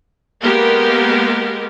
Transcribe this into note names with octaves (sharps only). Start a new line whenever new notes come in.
G#3 A#3 B3 G4 A#4